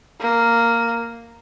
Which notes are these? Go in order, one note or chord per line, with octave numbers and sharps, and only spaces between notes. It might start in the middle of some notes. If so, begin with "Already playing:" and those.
A#3